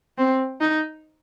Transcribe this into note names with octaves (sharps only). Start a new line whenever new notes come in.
C4
D#4